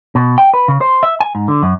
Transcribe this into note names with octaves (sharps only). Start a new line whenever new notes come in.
B2
G5
B4
C#3
C5
E5
G#5
G#2
D3
F#2